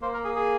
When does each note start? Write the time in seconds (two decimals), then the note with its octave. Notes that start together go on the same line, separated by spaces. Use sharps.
0.02 A#3 C5
0.14 A#4
0.24 G#4
0.36 G#4